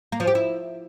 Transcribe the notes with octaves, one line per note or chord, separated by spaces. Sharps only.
A#3
F3
G4
E4